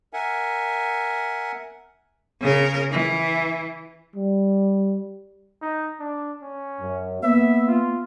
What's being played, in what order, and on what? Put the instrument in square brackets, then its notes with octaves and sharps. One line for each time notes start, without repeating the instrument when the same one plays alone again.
[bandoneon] A#4 E5 F#5 G#5
[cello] C#3 A#4
E3
[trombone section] G3
[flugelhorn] D#4
D4
C#4
[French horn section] F#2
[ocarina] A#3 [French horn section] B3 [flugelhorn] E5
[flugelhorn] F4